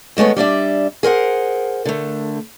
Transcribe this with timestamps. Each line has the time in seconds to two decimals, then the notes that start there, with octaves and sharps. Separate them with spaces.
0.17 D#2 G#3 A3 B3 C#5
0.36 G3 D4 D5 E5
1.03 G#4 A#4 C5 F#5
1.85 D3 A3